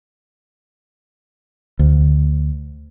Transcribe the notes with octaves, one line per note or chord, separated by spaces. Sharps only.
D2